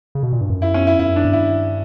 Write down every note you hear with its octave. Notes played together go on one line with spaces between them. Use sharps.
C#3
B2
A#2
G2
F#2
E4
C#4
E4
F#2 E4
D4
G2
E4